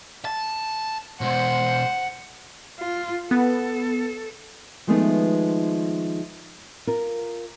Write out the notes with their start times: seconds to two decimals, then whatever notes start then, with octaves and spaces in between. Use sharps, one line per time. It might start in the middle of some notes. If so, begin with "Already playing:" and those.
0.25 A5
1.21 B2 G#3 C5 F#5
2.80 F4
3.31 B3 A4
4.87 D#3 F3 G#3 A3 B3 D#4
6.87 F4 A#4